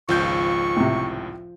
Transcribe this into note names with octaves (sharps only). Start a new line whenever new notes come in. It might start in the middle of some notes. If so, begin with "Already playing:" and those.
G#1 C#2 F3 C#6 G6
A2 C3